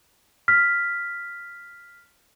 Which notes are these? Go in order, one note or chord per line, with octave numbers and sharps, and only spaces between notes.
F6 B6